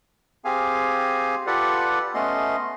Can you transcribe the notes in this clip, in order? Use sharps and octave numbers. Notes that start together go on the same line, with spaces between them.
C4 G4 G#4 F5 G#5
F4 G4 A4 B4 D5 F#5
A3 B3 C#4 D#5 C6